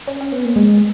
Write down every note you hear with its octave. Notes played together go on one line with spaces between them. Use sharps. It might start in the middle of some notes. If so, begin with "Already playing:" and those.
C#4
C#4
B3
A#3
G#3